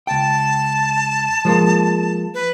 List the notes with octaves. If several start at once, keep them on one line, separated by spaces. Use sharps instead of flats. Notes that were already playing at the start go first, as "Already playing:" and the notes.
C#2 G5 A5
F3 G#3 A#3
B4